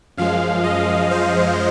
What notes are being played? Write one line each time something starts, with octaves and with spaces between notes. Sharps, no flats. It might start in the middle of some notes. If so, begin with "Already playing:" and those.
F#2 F3 G#3 F5
D#5
C5